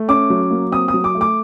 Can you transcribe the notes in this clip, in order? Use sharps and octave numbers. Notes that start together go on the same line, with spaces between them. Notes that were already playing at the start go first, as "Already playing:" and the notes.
Already playing: A3
C#4 D6
F#3
A#3
C4 D#6
D#6
F#3
D6
A3
D6